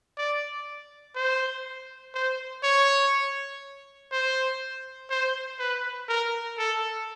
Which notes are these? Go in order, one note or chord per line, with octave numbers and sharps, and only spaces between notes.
D5
C5
C5
C#5
C5
C5
B4
A#4
A4